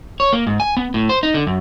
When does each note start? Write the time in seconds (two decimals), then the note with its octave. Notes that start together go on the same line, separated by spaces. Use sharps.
0.20 C#5
0.33 A#3
0.47 G#2
0.60 G#5
0.77 B3
0.94 A2
1.09 C5
1.23 D#4
1.34 D3
1.47 F#2